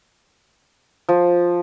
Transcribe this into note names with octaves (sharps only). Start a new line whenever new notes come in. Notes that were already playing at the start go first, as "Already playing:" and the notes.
F3